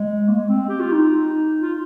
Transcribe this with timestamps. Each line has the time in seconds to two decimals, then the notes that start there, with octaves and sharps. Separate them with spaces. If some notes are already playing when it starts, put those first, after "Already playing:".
Already playing: G#3
0.28 A#3
0.35 G#3
0.49 C4
0.69 G4
0.80 F4
0.92 D#4
1.62 F4